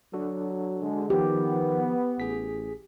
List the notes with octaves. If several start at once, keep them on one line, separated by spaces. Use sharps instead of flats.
F#3 D4 F#4 A4
D3 G#3
D#3 F3 B3 G4
A1 G#4 B6